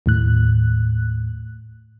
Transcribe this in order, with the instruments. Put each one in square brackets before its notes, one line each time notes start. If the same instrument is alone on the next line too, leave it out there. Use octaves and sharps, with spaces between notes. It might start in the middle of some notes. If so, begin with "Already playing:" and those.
[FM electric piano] D#2 A2 F#6